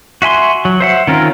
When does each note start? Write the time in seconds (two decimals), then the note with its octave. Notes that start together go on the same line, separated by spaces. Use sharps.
0.22 F#4 E5 G#5 C6
0.65 F#3
0.80 C5 E5 F#5
1.07 D#3 C4 C#4 F4 A#4